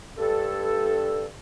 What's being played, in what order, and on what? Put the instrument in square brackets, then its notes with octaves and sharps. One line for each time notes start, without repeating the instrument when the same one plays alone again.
[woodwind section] G2 A4